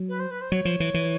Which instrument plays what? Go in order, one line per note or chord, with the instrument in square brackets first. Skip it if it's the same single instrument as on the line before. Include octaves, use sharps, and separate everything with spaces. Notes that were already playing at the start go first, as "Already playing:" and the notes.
Already playing: [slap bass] F#3
[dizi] B4
C5
B4
C5
[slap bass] F#3 [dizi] C#5
[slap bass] F3
E3
E3